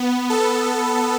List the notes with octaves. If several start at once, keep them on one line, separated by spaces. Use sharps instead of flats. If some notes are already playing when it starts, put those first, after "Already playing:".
Already playing: B3
A4